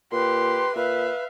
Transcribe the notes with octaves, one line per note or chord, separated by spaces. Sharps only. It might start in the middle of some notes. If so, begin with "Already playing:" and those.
A#2 G4 B4 C6
A#2 B4 E5 F5